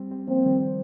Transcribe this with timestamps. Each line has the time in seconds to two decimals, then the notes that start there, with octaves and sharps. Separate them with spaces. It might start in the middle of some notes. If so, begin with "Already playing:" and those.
Already playing: G3 C4
0.11 G3 C4
0.28 F3 A#3 C4
0.38 A#3
0.45 D#3 G3